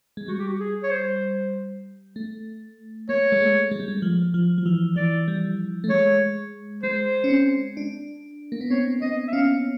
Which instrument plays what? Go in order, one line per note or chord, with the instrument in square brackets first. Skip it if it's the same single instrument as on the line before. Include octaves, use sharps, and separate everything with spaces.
[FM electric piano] G#3
[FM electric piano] G3 [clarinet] F#4
[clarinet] G4
F#4
G#4
C#5
C5
[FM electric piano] A3
[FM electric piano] A#3 [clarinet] C#5
[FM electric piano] G#3
A3
G#3
G3
G#3
F3
F3
F3
E3
[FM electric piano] E3 [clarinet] D5
[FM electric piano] G3
A3
[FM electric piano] G#3 [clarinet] C#5
[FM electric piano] G#3 [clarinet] C5
[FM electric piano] C#4
C4
D4
A#3
B3
[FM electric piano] C4 [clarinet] C#5
[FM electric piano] C4 [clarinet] D#5
[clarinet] E5
[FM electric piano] C#4 [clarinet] F5